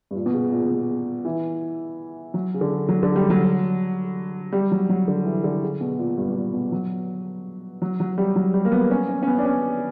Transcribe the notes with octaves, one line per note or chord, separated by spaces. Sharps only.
G2
A#2
B2
C#3
A#2
C#3
B2
E3
F#3
C#3
D3
F#3
D3
G3
F#3
G3
F#3
F#3
D3
E3
D3
C#3
B2
A#2
G2
G2
A#2
B2
F#3
F#3
F#3
G3
F#3
G3
A#3
B3
C#4
C#4
C#4
B3
D4
C#4